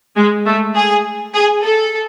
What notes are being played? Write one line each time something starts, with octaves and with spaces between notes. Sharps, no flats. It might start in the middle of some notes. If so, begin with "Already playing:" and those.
G#3
A3
G#4
G#4
A4